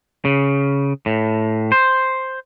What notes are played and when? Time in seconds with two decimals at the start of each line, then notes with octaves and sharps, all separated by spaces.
0.25 C#3
1.06 A2
1.72 C5